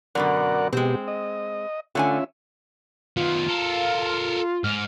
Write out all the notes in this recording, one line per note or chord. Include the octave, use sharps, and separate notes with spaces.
F#2 B2 D3 A#4 D5 F#5
B2 G#3 C4 G4
D#5
D3 A3 C#4 F4 E5 G#5
D#3 B3 F4
A4 A#4
G#2 F6